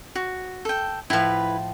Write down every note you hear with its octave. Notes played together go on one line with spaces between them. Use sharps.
F#4
A4 G5
A2 F3 E4 B4